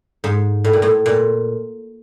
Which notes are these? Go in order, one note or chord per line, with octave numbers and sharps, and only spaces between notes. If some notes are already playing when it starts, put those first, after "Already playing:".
G#2
A2
A#2
A2
A#2